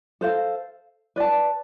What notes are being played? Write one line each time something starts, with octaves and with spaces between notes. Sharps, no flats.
A4 C5 F5
B4 D5 A5